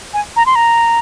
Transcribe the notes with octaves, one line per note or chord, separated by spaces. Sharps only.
G#5
A#5
C6
A#5